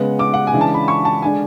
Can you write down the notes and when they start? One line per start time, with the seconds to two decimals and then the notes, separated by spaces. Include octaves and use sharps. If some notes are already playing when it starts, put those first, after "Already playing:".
Already playing: C#3 G#3 B3 F#5
0.19 D6
0.34 F#5
0.47 G#5
0.54 C#3 E3 G#3 D4
0.61 A5
0.74 B5
0.88 C#6
1.05 A5
1.22 D3 G#3 D4 G#5